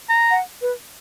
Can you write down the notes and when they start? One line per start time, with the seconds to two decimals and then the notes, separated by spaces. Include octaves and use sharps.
0.10 A#5
0.31 F#5
0.62 B4